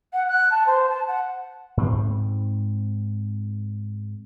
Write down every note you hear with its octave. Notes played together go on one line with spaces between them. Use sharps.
F#5
F#6
A5
C5
A5
F#5
G#2 C4